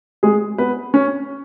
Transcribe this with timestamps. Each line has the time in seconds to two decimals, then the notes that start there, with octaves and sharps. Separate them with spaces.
0.23 G#3 G#4
0.58 B3 B4
0.94 C#4